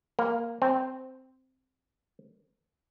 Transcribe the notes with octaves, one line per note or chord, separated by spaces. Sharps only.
A#3
C4